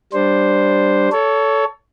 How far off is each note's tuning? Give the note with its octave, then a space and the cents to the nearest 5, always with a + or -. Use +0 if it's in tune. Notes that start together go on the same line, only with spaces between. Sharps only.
G3 +0 D4 +0 C5 +0
A4 +0 C#5 +25